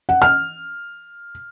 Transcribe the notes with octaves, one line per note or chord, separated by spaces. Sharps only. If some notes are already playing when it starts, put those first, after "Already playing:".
F#5
F6